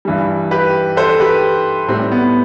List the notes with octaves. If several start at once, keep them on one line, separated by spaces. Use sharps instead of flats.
G2 E3 G3
G4 B4
A4 C5
G4 B4
A2 G3 C4
B3